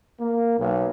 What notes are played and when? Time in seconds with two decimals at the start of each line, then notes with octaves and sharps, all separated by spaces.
0.19 A#3
0.58 B1